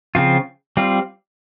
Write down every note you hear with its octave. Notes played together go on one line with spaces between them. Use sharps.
C#3 F3 C4 F4
G3 C4 F4